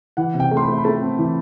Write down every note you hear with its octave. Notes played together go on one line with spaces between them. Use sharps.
E3 F#5
C3
G5
A3
C6
B5
A3
B5
A3 A5
C4
E3